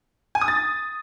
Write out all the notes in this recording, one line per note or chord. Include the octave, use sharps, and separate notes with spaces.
G#5
D#6
A6